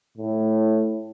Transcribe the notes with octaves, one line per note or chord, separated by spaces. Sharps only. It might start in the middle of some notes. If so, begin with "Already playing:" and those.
A2